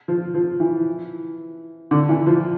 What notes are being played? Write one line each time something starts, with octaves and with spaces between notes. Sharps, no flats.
F3
F3
E3
D3
E3
F3